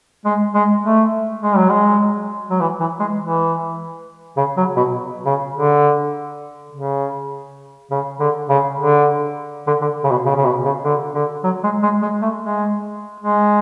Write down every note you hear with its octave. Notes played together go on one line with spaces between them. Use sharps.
G#3
G#3
A3
G#3
F#3
G#3
F#3
E3
E3
G#3
E3
C#3
F#3
B2
C#3
D3
C#3
C#3
D3
C#3
D3
D3
D3
C#3
B2
C#3
C#3
B2
C#3
D3
D3
F#3
G#3
G#3
G#3
A3
G#3
G#3